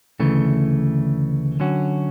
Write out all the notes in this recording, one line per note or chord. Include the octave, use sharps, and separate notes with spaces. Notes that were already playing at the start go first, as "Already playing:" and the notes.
D2 C#3 E3 A3
D3 F#3 C#4 F#4